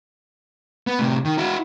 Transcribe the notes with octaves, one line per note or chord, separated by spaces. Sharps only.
B3
A2 C3
D#3
E4 F#4